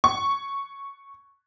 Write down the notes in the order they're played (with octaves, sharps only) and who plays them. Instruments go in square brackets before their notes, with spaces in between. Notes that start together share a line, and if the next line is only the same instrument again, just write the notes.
[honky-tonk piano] C#6